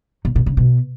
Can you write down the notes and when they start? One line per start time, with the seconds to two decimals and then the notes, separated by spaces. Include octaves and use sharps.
0.25 A#2
0.36 A#2
0.46 C#3
0.57 B2